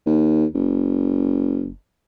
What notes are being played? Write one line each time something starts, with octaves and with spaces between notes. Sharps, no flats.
D#2
F#1